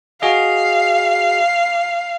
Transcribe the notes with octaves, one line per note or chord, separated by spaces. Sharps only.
F#4 G#4 D#5 F5